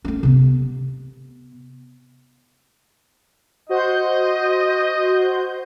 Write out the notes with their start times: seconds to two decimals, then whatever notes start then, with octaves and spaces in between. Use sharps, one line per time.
0.05 A3 C#4
0.23 C3 B3
3.69 F#4 C5 D#5 G6